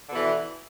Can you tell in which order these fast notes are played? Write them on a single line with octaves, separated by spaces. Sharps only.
D3 B2 E3